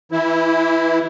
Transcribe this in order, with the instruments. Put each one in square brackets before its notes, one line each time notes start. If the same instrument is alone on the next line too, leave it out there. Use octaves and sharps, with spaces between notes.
[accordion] E3 E4